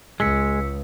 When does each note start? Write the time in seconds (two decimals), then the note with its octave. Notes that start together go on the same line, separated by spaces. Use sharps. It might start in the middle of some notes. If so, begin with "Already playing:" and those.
0.20 C#2 G#3 E6 B6 C#7